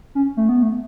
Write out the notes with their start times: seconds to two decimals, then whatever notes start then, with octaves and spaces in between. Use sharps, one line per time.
0.15 C#4
0.37 A3
0.49 B3
0.62 A3